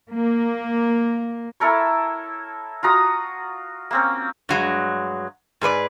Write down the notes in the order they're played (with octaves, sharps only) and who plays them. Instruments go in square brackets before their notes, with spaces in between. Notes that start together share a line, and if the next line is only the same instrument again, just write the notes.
[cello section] A#3
[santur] E4 A4 A#4 C#5
F4 F#4 A#5 D#6
A#3 C4 C#4
[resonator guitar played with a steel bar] G2 F#3 G#3
G#2 G#4 B4 D5